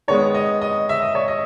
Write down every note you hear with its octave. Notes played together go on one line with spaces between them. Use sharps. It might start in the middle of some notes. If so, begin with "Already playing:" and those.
D#3 G#3 B3 C#5
D#5
D#5
E5
D#5
C#5
D#5